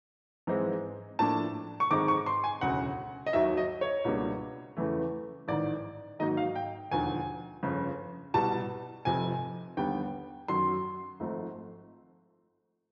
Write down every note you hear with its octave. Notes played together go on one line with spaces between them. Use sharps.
G#2 E3 G#3 C4 D#4
A2 F3 A#3 D4 A5
C#6
G#2 D#3 G#3 C4 D#4 D6
C#6
C6
G#5
E1 D2 C#3 F#5
D#5
D#2 D#3 F#3 E5
D#5
C#5
C#2 B2 G3 A#3 D4
E2 C#3 E3 A3
A1 G#2 D#3 D5
G#2 D#3 F#3 A#3 D#4 D#5
F5
G5
E1 D#2 D3 F3 G#5
G1 F2 C#3
C2 B2 G3 A5
F1 F2 C3 F3 G#5
D#2 D3 G3 B3 G5
F#2 D#3 F#3 C6
G#1 G#2 F3 A3 C4